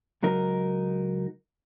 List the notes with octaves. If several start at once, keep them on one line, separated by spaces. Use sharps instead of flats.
C#2 F#3 D#4 A#4